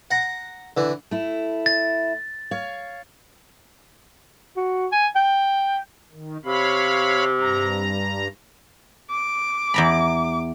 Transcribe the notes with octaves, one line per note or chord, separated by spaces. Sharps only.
F#5 A#5
D3 E3
A3 E4
A6
C#5 F5
F#4
G#5
G5
D#3
C3 C#5 F5 B5
G2 A#5
D6
E2 A#5 B5